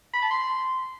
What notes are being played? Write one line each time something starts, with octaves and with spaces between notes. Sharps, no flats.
B5
A5
C6